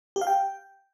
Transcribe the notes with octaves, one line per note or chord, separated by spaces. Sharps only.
G4
F5
G5